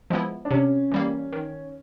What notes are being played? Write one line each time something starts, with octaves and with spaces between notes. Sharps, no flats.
F3 G#3 B3 E4
D4
C3 C#4
E3 G3 A#3
D#3